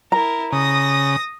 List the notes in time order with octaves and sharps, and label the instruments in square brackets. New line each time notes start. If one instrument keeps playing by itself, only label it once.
[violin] E4 A#4 [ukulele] A#5
[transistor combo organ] C#3 [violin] D#6 A#6